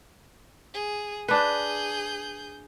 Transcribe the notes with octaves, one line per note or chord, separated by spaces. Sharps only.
G#4
D4 G#4 B4 G6